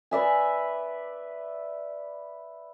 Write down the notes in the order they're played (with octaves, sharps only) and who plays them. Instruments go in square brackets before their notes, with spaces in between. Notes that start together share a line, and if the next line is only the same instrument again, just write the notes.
[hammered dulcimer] B4 D5 E5 G#5